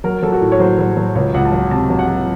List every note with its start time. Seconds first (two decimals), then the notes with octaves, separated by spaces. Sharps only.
0.04 F#3 A#4
0.22 F#3 A4
0.32 F#4
0.41 A2
0.52 C#5
0.59 F#3 C5
0.79 F#3
0.97 F#3
1.15 C#2 C#5
1.34 C#2 F#5
1.45 A5
1.52 F#3 F#5
1.71 C3 A5
1.90 F#3
1.99 F#5
2.08 F#3